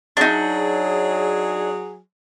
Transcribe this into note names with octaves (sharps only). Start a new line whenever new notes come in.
F#3 D4 D#4 G#4